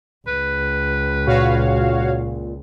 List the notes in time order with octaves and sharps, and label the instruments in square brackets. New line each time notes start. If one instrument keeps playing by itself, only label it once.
[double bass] C#2 [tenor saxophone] B4
[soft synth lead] A#2 [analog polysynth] F#4 C#5 F5